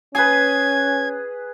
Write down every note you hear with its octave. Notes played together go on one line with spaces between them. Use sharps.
C#4 G#4 B4 G#6